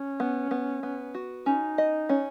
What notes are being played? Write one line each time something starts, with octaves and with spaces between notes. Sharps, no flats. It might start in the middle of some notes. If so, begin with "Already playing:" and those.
Already playing: C#4
B3
B3
B3
F#4
C#4 D#4
D#5
C#4